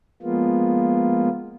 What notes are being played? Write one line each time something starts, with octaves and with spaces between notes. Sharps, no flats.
F3 G#3 A#3 B3 F4